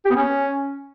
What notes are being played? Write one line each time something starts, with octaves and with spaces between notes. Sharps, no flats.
G4
B3
C#4